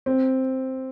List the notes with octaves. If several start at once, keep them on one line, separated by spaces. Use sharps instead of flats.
C4